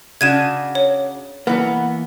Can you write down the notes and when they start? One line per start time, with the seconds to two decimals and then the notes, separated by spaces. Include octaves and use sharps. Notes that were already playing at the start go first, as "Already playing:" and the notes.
0.21 C#3 D4 F#4 G#6 D#7 E7
0.75 C#5
1.47 E3 A#3 B3